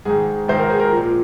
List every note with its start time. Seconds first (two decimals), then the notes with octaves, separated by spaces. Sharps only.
0.05 G#2 D#3 G#4
0.48 G#2 D#3 C5
0.59 A#4
0.70 G#4
0.80 A#4
0.92 A#2 F3